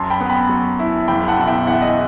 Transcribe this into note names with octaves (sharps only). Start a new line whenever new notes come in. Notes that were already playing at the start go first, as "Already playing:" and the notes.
Already playing: F#2 A5 C6
G5 B5
B3
G5 B5
F#3
E4
F#1 G5 B5
F#5 A5
B2
E5 G5
E2 F#5
E5
D#5 F#5